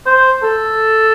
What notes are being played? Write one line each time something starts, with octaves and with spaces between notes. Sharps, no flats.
C5
A4